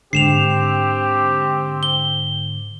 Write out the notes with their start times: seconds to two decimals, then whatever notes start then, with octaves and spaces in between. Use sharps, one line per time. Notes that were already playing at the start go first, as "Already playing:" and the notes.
0.13 G#2 D3 C4 G4 C7 E7 F7
1.83 G7